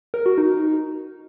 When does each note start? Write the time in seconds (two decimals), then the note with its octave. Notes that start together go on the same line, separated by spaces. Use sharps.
0.14 A#4
0.26 F#4
0.38 D#4